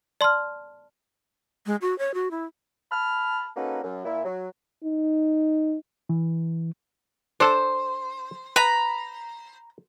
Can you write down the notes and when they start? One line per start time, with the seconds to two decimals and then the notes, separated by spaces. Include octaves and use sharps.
0.21 D5 A5 C6 F6
1.66 G#3
1.81 F#4
1.99 C#5
2.14 F#4
2.31 E4
2.91 A5 B5 F6
3.56 A#3 C#4 D#4 F#4 A4 B4
3.84 F#2
4.05 A#2 E4
4.25 F#3
4.84 D#4
6.09 E3
7.40 D4 A4 C5 A5
8.56 B4 A#5 B5